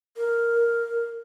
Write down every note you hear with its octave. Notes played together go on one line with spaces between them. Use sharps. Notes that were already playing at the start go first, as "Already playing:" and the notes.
A#4